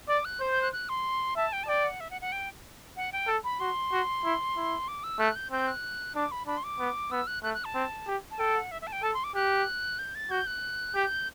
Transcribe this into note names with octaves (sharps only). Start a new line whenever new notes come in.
D5 D6
F#6
C5 G6
G6
F#6
F#6
C6
E5 A5
G5
A5
D5 G5
F#5
E5
F#5
F#5
G5
F#5
G5
A4
B5
F#4 C6
F#4
E4
E4
D6
E6
A3 F#6
G6
C4 G6
F#6
D4 D6
B5
D4 B5
C6
D6
B3
B3 E6
F#6
A3 F#6
F#6
A5
C4
G4
A5
A4 G5
F#5
E5
E5
A5
G5
A4 A5
C6
D6
G4 F#6
G6
A6
F#4 G6
F#6
G4 G6